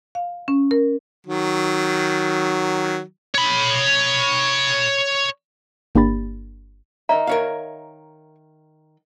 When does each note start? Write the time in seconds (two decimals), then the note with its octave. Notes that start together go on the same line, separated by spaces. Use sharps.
0.15 F5
0.48 C#4
0.71 A#4
1.27 D#3 F#3
3.35 C#5 B5
5.95 G1 A#3 D4 G4 B5 A6
7.09 D#3 D#5 E5 A#5
7.27 A#4 C#5 F5